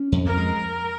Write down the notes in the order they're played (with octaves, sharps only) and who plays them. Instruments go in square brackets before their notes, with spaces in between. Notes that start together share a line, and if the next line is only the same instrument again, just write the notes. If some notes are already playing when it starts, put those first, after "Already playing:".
Already playing: [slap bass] C#4
F2
[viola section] A#4
[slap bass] G#3